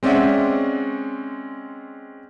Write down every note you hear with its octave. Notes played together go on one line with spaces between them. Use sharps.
G#3 C4 C#4 D5 E5 F#5